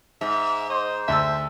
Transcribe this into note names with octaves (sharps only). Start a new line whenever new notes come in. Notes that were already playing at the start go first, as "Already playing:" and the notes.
G#2 E5
C5 D#5
D2 E5 A5 E6